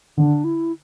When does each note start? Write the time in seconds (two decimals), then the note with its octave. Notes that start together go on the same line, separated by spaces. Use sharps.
0.17 D3 D4
0.44 E4